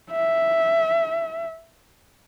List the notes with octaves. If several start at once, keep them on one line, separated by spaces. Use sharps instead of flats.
E5